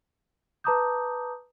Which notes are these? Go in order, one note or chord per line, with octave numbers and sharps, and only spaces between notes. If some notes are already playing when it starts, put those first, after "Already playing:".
B4 A5 A#5 D6 D#6 G6